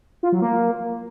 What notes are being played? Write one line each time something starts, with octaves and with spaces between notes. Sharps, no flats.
F4
F#3
A#3